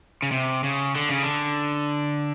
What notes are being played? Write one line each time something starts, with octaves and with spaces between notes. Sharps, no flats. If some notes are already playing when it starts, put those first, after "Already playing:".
C#3
C3
C#3
D3
C#3
D3